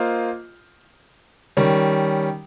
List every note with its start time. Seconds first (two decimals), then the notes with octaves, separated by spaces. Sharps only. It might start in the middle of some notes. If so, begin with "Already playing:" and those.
Already playing: A#3 F4 C5 D#5
1.57 D#3 G3 C#4